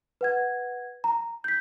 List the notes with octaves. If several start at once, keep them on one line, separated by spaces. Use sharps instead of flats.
B4 F#5 G#6
A#5
G6 B6